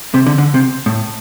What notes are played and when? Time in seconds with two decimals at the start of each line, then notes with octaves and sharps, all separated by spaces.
0.14 C3
0.27 D3
0.38 D3
0.54 C3
0.86 A2